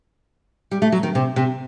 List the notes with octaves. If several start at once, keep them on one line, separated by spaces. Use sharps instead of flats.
G3
A3
F#3
D#3
C3
C3